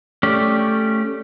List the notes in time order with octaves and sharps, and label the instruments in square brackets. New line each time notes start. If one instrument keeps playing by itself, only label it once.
[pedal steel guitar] A3 C#4 G4 D5